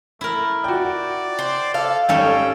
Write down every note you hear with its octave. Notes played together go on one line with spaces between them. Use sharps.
A3 E4 A#4
F#4 D5 G5
C5
A4 F5
G#1 G3 C#4 A4 G5